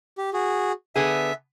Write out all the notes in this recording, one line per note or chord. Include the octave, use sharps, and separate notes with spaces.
G4
F#4 G#4
D3 B3 G#4 E5